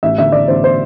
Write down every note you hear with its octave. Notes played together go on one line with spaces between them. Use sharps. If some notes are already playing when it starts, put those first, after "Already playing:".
A1 E5
D3 E5
A1 D5
A1 C5
C5